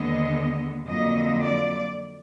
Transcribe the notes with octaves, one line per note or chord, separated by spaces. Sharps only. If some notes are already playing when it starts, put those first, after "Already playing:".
Already playing: D#2 D3 G#3 B3 D#5
F2 D3 F#3 A#3 D#5
D5